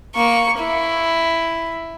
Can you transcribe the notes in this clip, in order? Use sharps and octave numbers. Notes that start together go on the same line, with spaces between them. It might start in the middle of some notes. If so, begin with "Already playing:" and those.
A#3 C#6
E4